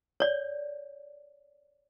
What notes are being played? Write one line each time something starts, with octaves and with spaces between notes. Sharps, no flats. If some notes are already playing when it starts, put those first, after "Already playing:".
C#5 D5